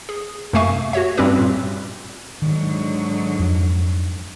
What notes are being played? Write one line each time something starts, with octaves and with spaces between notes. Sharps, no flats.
G#4
F#2 C3 A3 F5 G#5 C#6
F#4 G4 C#5 E5
G2 G3 C4 C#4 G4 B4
A#2
G#2 D3 D#3 F#3
F2